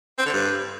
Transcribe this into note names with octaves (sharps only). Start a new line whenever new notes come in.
C4
D3
G2